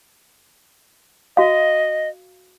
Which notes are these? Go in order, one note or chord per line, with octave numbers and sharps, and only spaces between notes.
F#4 D#5 F5